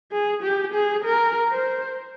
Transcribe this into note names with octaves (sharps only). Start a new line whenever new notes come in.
G#4
G4
G#4
A#4
C5